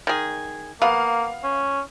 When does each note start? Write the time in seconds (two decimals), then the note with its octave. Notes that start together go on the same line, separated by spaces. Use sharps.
0.07 D#3 G#4
0.82 A#3 B3 F5
1.44 C#4